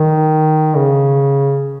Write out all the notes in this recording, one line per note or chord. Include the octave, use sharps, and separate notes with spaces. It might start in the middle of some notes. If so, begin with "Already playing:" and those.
Already playing: D#3
C#3